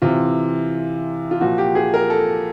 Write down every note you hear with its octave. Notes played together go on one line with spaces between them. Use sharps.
C3 E3 F4
F4
A#2 F3 F#4
G4
G#4
A#4
A4